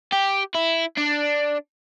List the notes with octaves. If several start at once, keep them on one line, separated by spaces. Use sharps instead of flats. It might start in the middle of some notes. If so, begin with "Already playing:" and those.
G4
E4
D4